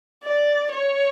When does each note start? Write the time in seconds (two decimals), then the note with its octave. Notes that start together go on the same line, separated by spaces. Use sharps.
0.24 D5
0.71 C#5